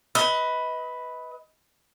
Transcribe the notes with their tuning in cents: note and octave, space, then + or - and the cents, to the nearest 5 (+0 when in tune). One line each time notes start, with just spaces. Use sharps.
B4 +0 D#5 +35